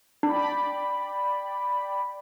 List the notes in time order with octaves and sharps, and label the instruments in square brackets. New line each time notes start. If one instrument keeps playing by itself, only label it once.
[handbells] D4 [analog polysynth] D5 G5 B5